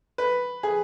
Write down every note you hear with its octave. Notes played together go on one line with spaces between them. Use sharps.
B4
G#4